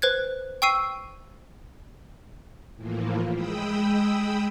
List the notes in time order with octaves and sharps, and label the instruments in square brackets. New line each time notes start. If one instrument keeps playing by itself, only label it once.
[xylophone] B4 C5 F#6 G#6
G5 C#6 E6 C7 D#7
[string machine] A2 E3 F3 A#3
G#3 G5 B5 D#6 E6